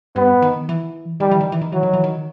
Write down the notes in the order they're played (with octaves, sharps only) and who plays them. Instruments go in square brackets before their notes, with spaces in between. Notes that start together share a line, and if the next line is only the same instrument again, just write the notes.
[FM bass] G2 [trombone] B3
[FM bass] D#3
E3
[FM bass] D#3 [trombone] G3
[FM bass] E3
D#3
E3
D#3
[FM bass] E3 [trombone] F#3
[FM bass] D#3
E3
D#3